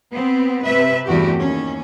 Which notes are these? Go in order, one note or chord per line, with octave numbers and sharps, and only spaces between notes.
B3 C4
C3 B4 E5
E2 G2 A3 F#4 G4
D#2 C#4